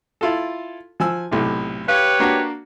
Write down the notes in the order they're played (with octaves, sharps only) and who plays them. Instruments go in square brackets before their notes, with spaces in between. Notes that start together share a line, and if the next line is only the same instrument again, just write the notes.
[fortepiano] E4 F4 A4
F3 G#5 E6
B1 A2 C3
[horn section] G4 B4 C#5 [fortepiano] F5
[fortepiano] A#3 D4 F#4